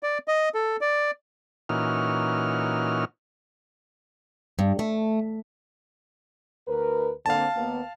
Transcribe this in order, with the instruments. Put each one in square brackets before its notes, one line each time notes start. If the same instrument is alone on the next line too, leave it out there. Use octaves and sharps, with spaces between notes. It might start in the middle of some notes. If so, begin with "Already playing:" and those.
[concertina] D5
D#5
A4
D5
[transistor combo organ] A#2 E3 C#4 D#4 F#4 F6
[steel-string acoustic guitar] G2
A3
[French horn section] D2 A#4 B4
[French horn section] D3 A#3 C4 [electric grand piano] F5 A5
[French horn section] D#2 A#3 B3